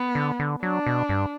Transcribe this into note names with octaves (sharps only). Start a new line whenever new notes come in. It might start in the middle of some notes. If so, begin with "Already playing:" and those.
Already playing: B3
D3
D3
F#3 D4
B2
G2